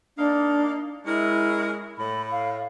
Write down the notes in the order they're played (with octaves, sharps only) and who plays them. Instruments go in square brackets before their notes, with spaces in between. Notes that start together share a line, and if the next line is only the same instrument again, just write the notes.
[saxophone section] A#3 D#4 F5 [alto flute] D4
[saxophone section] G#3 C#4 A#4 [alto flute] E4
[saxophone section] A2 [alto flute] B5
[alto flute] F5